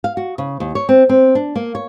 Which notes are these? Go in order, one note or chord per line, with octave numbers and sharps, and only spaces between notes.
F5
F#4
C#3
D#2
C#5
C4
C4
D4
A#3
C#5